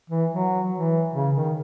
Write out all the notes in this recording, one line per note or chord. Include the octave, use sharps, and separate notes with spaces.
E3
F#3
E3
C#3
D#3